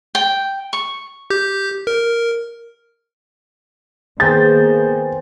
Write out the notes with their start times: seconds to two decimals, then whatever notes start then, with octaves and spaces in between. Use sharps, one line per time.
0.15 G5
0.73 C#6
1.30 G4 G6
1.87 A#4
4.20 D#3 A#3 B3 G#4 C5 G5 A6